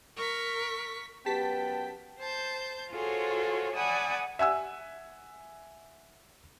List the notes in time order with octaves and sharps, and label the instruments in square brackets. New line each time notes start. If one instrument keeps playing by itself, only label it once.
[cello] A#4 [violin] C#6 B6
[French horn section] F#2 B3 B4 [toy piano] G4 [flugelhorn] G5 [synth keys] A5 B6
[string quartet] C5 A5 G6
F4 F#4 G#4 A4 C5 C#5
D5 F#5 G#5 A5 B5 D#6
[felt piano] E5 F#5 G#5 E6